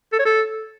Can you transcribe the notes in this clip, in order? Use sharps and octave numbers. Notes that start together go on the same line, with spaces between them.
A4
C#5
A4